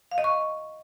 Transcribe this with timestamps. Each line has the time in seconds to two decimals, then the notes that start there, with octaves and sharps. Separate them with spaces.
0.11 F5
0.18 D#5
0.24 C#6